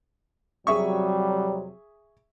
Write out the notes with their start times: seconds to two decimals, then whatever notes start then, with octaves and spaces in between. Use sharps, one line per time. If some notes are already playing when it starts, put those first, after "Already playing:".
0.67 F2 C3 F#3 G3 G#4 E5 C#6